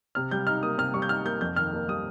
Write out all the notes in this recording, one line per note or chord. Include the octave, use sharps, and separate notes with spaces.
C3 F6
G3 G6
D#4 F6
A#3 D#6
C3 F6
G3 C#6
G6
D#4 F6
A#3 G6
F2 G6
D#3 F6
A#3
G3 D#6